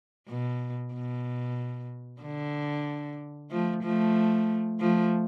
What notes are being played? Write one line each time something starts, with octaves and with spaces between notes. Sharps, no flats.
B2
B2
D3
F3 A3
F3 A3
F3 A3